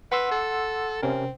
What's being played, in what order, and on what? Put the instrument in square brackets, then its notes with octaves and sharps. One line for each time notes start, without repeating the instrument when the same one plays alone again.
[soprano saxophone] B4 [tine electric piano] F#5 C6 E6
[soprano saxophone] A4
[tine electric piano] C3 C#4 A#4 [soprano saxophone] C4